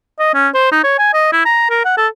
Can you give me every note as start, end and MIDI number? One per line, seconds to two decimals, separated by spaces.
0.19 0.32 75
0.34 0.48 61
0.54 0.68 72
0.72 0.80 63
0.84 0.94 73
0.98 1.11 80
1.14 1.29 75
1.32 1.41 64
1.45 1.69 82
1.70 1.80 70
1.85 1.93 78
1.97 2.07 69